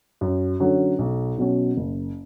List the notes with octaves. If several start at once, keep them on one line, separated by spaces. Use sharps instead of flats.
F#2
D3 F#3 C#4
B1
B2 F#3 C#4
F#1